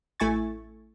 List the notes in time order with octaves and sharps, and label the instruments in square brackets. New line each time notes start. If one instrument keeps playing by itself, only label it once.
[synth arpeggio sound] A1 A3 E4 G#5 C#6 A6